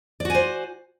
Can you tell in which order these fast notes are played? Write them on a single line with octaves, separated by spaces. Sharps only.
D5 F#4 G#5 C5